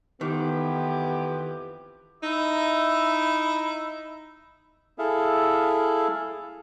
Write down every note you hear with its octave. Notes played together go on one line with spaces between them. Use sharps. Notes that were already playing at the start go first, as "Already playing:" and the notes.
F2 D#3 E3 B3 G4
D#4 E4 E5
E4 G#4 A4 E5 F5